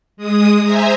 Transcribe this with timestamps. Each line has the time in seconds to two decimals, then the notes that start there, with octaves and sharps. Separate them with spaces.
0.17 G#3 D#6
0.64 C5 E5 G#5 A#5